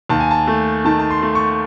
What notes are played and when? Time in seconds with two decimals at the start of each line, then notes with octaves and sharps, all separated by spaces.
0.09 D#2 A5
0.20 G#5
0.31 A5
0.47 A3
0.85 D#3 A5
0.99 A5
1.11 C6
1.23 A3
1.35 C#6